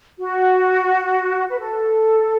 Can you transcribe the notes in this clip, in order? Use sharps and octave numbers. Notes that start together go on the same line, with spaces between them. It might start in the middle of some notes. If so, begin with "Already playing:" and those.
F#4
B4
A4